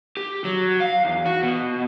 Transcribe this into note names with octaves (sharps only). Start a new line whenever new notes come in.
G4
F#3
F5
E2
F#4
B2